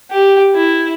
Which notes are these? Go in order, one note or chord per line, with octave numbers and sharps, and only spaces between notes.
G4
E4